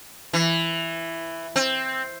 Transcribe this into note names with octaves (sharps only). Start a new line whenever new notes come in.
E3
C4